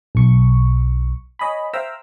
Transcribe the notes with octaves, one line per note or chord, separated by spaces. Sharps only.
B1 C#6
C#5 D#5 G#5 B5
C5 E5 F5 G5 A#5 E6